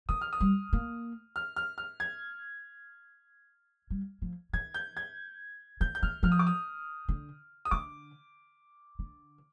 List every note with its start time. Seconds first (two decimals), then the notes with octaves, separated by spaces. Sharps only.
0.09 D#3 D#6
0.21 F6
0.33 D#6
0.40 G3
0.73 A#3
1.36 F6
1.56 F6
1.78 F6
2.00 G#6
3.90 G3
4.22 F3
4.53 D#3 G#6
4.74 G6
4.97 G#6
5.81 D#3 G6
5.95 G6
6.03 D#3 F6
6.23 F3 F6
6.32 D#6
6.39 D6
6.47 D#6
7.09 D3
7.65 D#6
7.71 D3 D6
8.99 D3